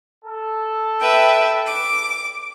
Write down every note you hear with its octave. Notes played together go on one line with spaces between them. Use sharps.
A4
B4 E5 G5
D6